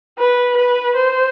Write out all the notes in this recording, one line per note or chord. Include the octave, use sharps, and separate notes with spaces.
B4
B4
C5